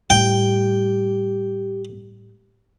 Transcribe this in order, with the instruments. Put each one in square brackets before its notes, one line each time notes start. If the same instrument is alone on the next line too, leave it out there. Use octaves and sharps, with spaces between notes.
[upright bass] A2 G3 [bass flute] G4 [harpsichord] G5